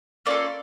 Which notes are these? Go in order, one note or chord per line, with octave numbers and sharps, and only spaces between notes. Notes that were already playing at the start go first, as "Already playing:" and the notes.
A#3 C#4 F4 A4 D5